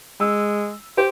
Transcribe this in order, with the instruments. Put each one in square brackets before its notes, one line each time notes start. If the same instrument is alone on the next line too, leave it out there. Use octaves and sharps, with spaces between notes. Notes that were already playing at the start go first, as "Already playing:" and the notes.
[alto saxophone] G#3 [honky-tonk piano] E6
[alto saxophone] G4 [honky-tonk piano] C5